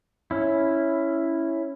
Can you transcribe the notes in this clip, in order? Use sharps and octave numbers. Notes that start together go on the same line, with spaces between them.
C#4 E4